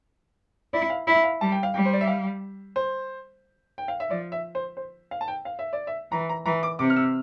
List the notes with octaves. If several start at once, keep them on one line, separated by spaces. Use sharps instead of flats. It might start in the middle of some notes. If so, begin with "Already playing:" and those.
E4 D5
F5
E4 E5
F5
G3 A5
G5
F5
G3 G5
C5
D5
E5
F5
C5
G5
F5
E5
F3 D5
E5
C5
C5
F5
A5
G5
F5
E5
D5
E5
E3 A#5
A#5
E3 A#5
D6
C3 D6
F6
E6